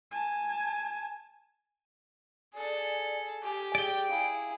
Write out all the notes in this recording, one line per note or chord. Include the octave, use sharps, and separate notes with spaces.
G#5 A5
G#4 A4 D5
G4 G#5
G#4 D5 G5
E4 G#4 F5